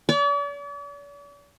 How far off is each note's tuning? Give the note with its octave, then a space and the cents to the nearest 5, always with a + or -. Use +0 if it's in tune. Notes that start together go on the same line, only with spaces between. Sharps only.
D5 -45